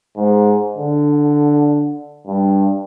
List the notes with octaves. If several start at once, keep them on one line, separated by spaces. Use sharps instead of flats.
G#2
D3
G2